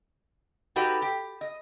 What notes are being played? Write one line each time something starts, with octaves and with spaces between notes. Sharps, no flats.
D#4 F#4 G4 A4 B4
G4
D#5